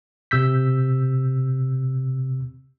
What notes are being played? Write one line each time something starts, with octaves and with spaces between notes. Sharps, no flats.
C3 E6 G6 B6